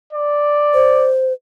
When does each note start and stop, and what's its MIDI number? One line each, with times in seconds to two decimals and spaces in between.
0.13 1.10 74
0.74 1.33 72